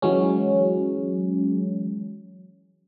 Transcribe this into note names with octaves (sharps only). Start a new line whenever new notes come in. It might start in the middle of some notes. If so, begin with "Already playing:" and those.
E3 F#3 G#3 C#4